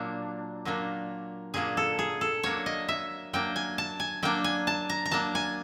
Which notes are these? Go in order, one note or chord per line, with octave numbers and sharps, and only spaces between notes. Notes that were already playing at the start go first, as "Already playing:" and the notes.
Already playing: A#2 F#3 A#3 D4
A#2 F#3 A#3 D4
A#2 F#3 A#3 D4 G#4
A4
G#4
A4
F#3 A#3 D4 C#5
D#5
E5
F#3 A#3 D4 G5
G#5
A5
G#5
F#3 A#3 D4 G5
G#5
A5
A#5
A#5
F#3 A#3 D4 A5
G#5